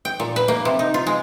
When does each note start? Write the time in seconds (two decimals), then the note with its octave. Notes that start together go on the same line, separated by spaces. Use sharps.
0.05 G5
0.20 A#2
0.36 B4
0.48 A#3
0.65 C3
0.79 D#4
0.94 F4
1.07 G#3